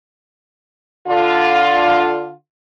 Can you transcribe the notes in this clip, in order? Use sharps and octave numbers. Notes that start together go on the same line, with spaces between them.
D3 F4